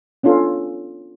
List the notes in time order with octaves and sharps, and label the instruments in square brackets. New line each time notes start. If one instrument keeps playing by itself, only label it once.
[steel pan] B3 C#4 D4 F4 A4